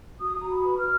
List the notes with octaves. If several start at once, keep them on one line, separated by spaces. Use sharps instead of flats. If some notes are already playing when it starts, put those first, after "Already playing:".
F#4 D#6
F#4 A#5
B5
B4
F6